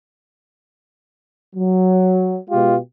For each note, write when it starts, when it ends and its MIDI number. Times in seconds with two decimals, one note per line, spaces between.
1.56 2.37 54
2.50 2.76 47
2.50 2.76 56
2.50 2.76 65
2.50 2.76 67